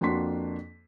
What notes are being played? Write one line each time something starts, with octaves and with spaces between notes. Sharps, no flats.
F2 A#3 D4 F#4 C6 B6